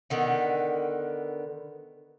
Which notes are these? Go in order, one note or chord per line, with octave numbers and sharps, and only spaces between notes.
D3 D#3 B3